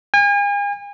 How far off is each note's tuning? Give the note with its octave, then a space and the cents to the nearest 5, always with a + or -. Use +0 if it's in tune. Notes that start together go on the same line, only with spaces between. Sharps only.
G#5 -40